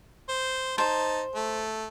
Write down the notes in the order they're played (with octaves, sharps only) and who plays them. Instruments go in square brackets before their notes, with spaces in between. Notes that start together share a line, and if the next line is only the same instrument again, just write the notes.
[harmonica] C5
[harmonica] D#4 A5 [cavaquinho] C5
[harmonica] A3